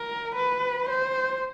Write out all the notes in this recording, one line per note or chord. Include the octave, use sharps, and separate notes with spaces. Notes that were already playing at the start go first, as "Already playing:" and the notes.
Already playing: A#4
B4
C5